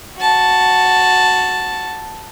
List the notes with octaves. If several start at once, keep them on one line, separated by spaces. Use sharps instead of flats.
F#4 A5